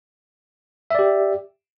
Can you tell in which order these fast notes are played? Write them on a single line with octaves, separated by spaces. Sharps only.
E5 D5 G4